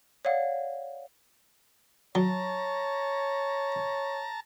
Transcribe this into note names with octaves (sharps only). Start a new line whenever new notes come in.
C#5 D5 F5 F#5
F#3 C#5 A5 A#5